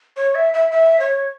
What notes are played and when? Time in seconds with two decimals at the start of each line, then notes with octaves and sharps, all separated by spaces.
0.16 C#5
0.35 E5
0.54 E5
0.71 E5
1.00 C#5